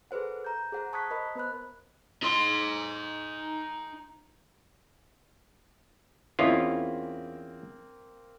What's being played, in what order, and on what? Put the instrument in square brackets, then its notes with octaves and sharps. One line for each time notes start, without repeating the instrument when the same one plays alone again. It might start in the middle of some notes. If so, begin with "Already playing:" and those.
[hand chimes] G#4 A4 B4 C5 F#5
A#5 G6
G#4 C5 F#5 A#5
A5 C#6 D#6 F#6 G#6 B6
A#4 C5 D#5 B5
B3 B4 C5 B5 F#6
[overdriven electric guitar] D#4 C6
[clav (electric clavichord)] E2 C#4 F4 [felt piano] A#3 C4 [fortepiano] E4 D#5 E5